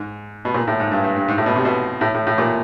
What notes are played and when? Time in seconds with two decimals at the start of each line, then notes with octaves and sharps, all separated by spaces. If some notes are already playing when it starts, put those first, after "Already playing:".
Already playing: G#2
0.45 B2
0.54 A#2
0.67 A2
0.80 G#2
0.92 G2
1.04 G2
1.16 G2
1.28 G#2
1.38 A2
1.46 B2
1.56 C3
1.65 B2
2.01 A2
2.14 A2
2.27 A2
2.38 A#2